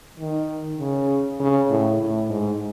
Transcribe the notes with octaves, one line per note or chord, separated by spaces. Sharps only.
D#3
C#3
C#3
A2
A2
G#2